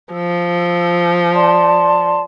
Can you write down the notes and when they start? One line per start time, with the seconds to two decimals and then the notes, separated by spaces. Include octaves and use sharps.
0.13 F3 E6
1.33 D5 A5 C6